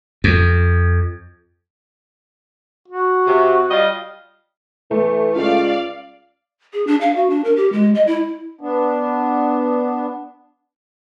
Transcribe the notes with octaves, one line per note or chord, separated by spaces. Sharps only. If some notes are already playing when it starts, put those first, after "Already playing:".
F2
F#4
C3
G3 F4 D#5
E3 A3
C#2 D5 F5
G#4
D4
F5
F#4
D4
A#4
G4
G#3
D#5
E4
B3 D4